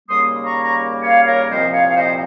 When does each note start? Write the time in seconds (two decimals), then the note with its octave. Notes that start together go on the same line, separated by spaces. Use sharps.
0.08 D#2 C#3 G3 A#3 C6 D#6
0.44 A#5 C#6
0.62 A#5 C#6
1.02 C#5 F5
1.25 A#4 C#5
1.48 C2 A#2 F3 C4 C5 D#5
1.72 C#5 F5
1.88 F5
1.96 C5 D#5